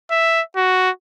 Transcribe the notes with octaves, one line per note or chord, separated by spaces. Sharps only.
E5
F#4